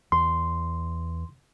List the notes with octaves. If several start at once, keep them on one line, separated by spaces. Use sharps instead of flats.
E2 C6